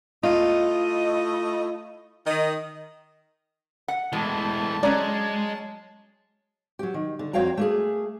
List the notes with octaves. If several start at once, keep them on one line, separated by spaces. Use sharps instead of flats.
A3 E4 F4 D#5
D#3 D#5
F#5
A2 E3 G#3 A5
F#3 G#3 C#4 D5
F#3 G4
D#3
D3
F2 F#4 C#5 F5 G5 A#5
A3 A#3 G#4